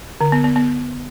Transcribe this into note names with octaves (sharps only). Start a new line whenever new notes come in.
D3
B3
B3
B3